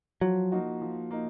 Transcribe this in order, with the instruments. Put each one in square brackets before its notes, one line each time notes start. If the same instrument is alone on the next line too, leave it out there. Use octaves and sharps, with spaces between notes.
[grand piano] F3 [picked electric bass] F#3
[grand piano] A#3 D#4 F#4
F3
A#3 D#4